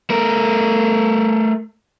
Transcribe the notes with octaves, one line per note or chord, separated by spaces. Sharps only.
A3 A#4